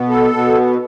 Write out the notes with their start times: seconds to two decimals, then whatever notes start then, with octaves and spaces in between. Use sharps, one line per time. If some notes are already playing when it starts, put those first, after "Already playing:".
Already playing: B2 B3
0.10 A4
0.32 B2 B3